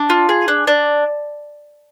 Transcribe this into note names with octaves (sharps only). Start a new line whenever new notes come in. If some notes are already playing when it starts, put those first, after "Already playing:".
Already playing: D4
F4
G#4
D4
D4